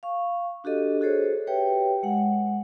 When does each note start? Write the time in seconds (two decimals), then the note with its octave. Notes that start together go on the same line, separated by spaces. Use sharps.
0.03 F5 C#6
0.64 D4 F#4 G4 A4 D#5
1.01 F#4 G#4 A4 C5 C#5
1.47 G4 B4 C#5 E5 G5
2.03 G#3 F#5